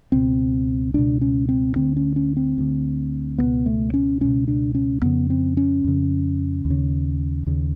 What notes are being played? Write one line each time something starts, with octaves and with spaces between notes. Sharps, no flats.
C#2 B2 C4
C#2 B2 D4
C#4
C4
D2 D3 C4
C#4
C#4
C4
D2 D3
C#2 B2 B3
A3
C#4
C#2 B2 C#4
D4
C#4
F2 C#3 B3
C4
C#4
F2 C#3
D#2
C#3
D#2 C#3